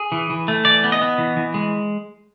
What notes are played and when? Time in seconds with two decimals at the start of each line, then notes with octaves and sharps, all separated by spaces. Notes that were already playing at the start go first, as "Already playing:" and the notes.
Already playing: G#4
0.12 E3
0.30 E3
0.48 A3
0.65 E3 D5
0.84 B3
0.92 D#5
1.02 B3
1.18 E3
1.37 E3
1.54 G#3